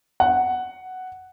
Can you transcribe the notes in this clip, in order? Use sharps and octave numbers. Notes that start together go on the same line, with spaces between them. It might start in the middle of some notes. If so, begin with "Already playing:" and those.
F#5